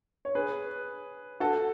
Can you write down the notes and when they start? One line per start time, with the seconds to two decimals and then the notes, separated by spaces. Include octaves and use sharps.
0.25 C#5
0.35 G#4 B4
1.40 F#4 A4